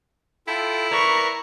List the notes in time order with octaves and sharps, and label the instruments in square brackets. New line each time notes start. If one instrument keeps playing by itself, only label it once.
[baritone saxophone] E4 [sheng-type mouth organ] F4 A4 G5
[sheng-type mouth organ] A#4 B4 D5 [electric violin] A#5 C#6